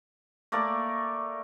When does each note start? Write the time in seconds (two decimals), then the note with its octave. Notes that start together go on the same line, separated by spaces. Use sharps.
0.52 A3 A#3 A#4 D5